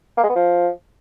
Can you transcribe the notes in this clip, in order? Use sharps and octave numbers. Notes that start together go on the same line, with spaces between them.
A#3
G#3
B3
F3